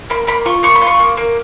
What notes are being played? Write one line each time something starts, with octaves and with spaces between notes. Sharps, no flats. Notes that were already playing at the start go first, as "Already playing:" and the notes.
A#3 B5
A#3 B5
F4 C#6
A#3 C#6
B5
F4
C#6
A#3
A#3